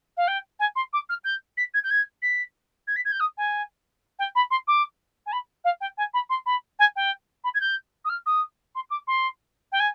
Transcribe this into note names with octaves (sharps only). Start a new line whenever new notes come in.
F5
G5
G#5
C6
D6
F6
G6
B6
G#6
G6
G#6
B6
G#6
B6
G#6
G6
D#6
G#5
G5
B5
C6
D6
G#5
B5
F5
G5
G#5
B5
C6
B5
G#5
G5
B5
G#6
G6
D#6
F6
D#6
C6
D6
C6
G5
G#5